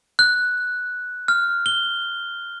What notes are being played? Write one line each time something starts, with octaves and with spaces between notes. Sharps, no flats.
F#6
F6
G7